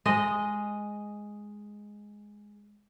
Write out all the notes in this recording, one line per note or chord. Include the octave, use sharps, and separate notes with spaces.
G#3 D#5